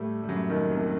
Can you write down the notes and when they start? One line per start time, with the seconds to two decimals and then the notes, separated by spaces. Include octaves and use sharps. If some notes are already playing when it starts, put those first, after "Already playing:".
Already playing: A2 G3 A3
0.23 G3
0.29 F#2 F#3
0.49 D#2 D#3
0.71 C2 C3